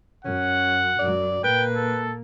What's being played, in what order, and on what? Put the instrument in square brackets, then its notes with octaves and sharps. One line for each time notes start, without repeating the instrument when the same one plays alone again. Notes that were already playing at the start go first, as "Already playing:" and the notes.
[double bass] F#2 [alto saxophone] C#4 [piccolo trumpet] F#5
[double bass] F#2 F#3 [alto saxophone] D5
[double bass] A#2 A#3 [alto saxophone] B4 [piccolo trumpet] G5
[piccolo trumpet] A4